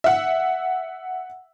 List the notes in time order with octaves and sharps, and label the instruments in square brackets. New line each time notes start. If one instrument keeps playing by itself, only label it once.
[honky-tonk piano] E5 F#5